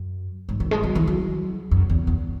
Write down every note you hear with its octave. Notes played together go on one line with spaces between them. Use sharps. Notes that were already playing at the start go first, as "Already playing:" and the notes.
Already playing: F#2
G#2
D#3
G#3
F#3
E3
F#3
F#2
E2
E2